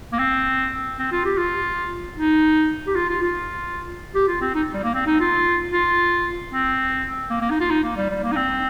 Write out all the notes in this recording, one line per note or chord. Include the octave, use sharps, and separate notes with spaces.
A#3
C4
C4
F4
G4
F4
D#4
G4
F4
F4
F4
G4
F4
C4
D#4
G3
A#3
C4
D#4
F4
F4
C4
A#3
A#3
D#4
F4
D#4
A#3
G3
G3
A#3
D#4
C4